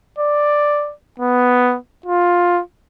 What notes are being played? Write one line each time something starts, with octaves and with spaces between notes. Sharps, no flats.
D5
B3
F4